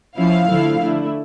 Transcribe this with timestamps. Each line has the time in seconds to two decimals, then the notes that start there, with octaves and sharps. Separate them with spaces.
0.17 F3 C#4 E4 F5
0.48 D3 F3 A3 E4
0.80 D3 A3 E4